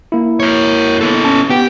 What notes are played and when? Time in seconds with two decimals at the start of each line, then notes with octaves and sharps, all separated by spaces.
0.12 A#3 E4
0.40 A#4 C#5
1.01 B3 A4
1.24 C#4 A5
1.50 B3 G4 G5